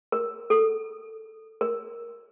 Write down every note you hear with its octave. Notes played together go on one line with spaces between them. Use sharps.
A#4
A4
A#4